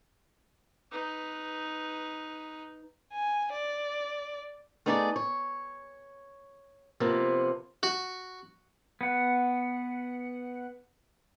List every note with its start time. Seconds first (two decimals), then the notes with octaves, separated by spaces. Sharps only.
0.92 D#4 B4
3.13 G#5
3.52 D5
4.86 A3 B3 D#4 G#4 B4 D5
5.16 C#5
7.00 C3 F3 A#3 B3
7.83 F#4
9.01 B3 F#5